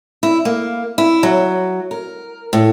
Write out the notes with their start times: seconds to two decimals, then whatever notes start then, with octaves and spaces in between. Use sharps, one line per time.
0.23 E4
0.45 A#3
0.98 E4
1.23 F#3
1.91 A#4
2.53 A2